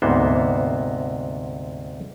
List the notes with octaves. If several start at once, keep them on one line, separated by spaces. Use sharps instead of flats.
D2 G#2 C3 A#3 B3 C5